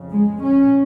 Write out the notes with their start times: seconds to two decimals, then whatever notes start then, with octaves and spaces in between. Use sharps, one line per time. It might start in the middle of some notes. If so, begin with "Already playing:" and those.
Already playing: F2 C#3
0.13 G#3
0.42 C#4